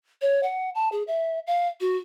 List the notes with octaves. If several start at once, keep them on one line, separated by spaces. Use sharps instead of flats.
C#5
F#5
A5
G#4
E5
F5
F#4